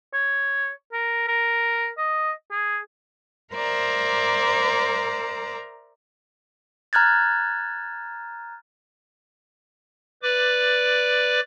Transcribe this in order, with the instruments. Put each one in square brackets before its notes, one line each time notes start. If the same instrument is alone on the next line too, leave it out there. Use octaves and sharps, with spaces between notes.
[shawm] C#5
A#4
A#4
D#5
G#4
[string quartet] A#4 C5 D5 E5 A#5
[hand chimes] A#5 F6 F#6 G#6 A6
[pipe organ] B4 D5 D6